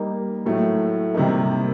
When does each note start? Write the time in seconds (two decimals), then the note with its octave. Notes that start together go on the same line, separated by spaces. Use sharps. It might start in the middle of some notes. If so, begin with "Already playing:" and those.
Already playing: G3 A#3 D#4
0.46 A2 F#3 A3
1.14 C3 D#3 G3 A#3 D#4